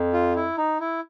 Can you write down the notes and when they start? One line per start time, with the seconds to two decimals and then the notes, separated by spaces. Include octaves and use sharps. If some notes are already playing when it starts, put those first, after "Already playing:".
Already playing: F2
0.13 F4
0.36 E4
0.58 D#4
0.80 E4